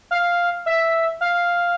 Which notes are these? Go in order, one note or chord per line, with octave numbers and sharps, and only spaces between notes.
F5
E5
F5